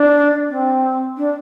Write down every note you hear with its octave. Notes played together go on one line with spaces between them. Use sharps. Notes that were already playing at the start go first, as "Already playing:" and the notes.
Already playing: D4
C4
D4